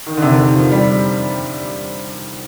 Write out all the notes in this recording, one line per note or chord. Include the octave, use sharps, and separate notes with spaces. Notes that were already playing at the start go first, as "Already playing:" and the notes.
D#3
D3
C3
D#3
F3
G3